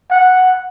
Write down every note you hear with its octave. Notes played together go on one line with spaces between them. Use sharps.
F#5